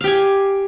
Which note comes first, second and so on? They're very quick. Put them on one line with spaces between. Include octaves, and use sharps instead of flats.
F5 G4 G#5